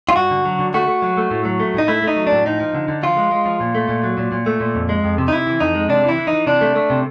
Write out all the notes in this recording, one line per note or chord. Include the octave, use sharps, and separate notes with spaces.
F4
G2 F#4
D3
F#3
D3
A3 F#4
A3
F#3
A3
A2
F#3
A3
A2 D#4
A3 E4
A3
D#4
F#3
D4
A2
F3 D#4
F3
D3
D3
F3 F4
G#3
G#3
F3
A#2
A3
A#2
F#3
A#2
A#2
A3
A#2
F2
G#3
F2
C3
D#4
C3 E4
E3
F2 D#4
G#3
C3 D4
E3
E4
E3
D#4
E3
C3 D4
A3
A3
C3